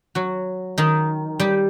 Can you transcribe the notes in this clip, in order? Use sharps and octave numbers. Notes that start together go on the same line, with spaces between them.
F#3 F#4
D#3 D#4
G3 G4